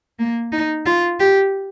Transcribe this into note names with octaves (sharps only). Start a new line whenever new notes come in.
A#3
D#4
F4
G4